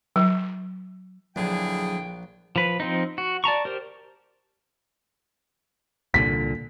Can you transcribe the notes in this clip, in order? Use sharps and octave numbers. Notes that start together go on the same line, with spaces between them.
F#3
A#1 D3 F#3 E4 G#4 G5
F3 B4
F3 C4 D#4
F#4
D5 A5 A#5 C#6
G4 A#4 C5
C2 A#2 D3 B6